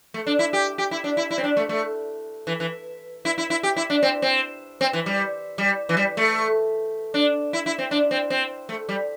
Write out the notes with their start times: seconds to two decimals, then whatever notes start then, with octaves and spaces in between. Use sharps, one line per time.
0.14 A3
0.27 D4
0.39 E4
0.53 G4
0.78 G4
0.91 E4
1.04 D4
1.17 E4
1.31 E4
1.38 C4
1.44 D4
1.57 A3
1.69 A3
2.47 E3
2.60 E3
3.25 E4
3.38 E4
3.50 E4
3.63 G4
3.76 E4
3.90 D4
4.03 C4
4.22 C4
4.81 C4
4.93 E3
5.06 G3
5.58 G3
5.89 E3
5.97 G3
6.17 A3
7.14 D4
7.53 E4
7.66 E4
7.79 C4
7.91 D4
8.11 C4
8.30 C4
8.69 A3
8.89 G3